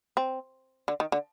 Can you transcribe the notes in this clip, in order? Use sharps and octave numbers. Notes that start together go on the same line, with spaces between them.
C4
D3
D#3
D3